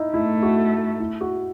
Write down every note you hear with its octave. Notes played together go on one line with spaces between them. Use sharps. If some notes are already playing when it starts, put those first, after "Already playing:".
Already playing: D#4 E4
A3 E4
F#4
E4
F#4